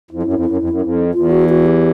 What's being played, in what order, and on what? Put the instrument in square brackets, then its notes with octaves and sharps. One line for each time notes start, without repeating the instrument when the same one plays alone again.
[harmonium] F2 [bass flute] E4
[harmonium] F#2
F2
F#2
F2
F#2
F2
[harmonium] E2 [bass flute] F4
[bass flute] F#4
F#4
G4